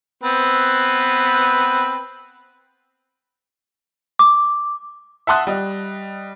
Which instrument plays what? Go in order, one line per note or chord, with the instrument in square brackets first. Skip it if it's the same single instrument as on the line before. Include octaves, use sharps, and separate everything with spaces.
[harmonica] B3 C4 B4
[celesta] D6
[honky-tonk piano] E5 F#5 A5 C6 D#6 F#6
G3 D#5